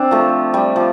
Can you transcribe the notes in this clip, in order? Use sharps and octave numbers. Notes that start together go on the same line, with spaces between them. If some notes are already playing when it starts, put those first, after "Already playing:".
Already playing: C4 D4
F3 A3
G3
F3